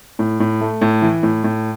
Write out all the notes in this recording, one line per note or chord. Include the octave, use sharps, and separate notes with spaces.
A2
A2
A3
A2
E3
A2
A2